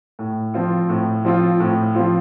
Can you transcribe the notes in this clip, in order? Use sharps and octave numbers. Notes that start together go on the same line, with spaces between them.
A2
F3 C4 F4
A2
F3 C4 F4
A2
F3 C4 F4